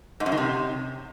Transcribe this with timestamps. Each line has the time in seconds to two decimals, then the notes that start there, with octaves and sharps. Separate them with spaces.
0.20 G#2
0.26 F#2
0.32 D#3
0.38 C3